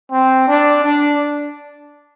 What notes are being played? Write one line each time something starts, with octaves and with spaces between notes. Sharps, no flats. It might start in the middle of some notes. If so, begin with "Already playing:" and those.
C4
D4
D4